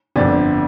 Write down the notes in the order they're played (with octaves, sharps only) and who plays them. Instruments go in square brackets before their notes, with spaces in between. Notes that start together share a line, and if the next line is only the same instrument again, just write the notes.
[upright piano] G1 F2 D3 D5